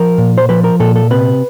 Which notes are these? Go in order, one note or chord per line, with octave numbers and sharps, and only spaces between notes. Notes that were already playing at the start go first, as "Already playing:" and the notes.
Already playing: F3 A#4
A#2
C5
F3 B4
A#4
A#2 A4
A4
C3 B4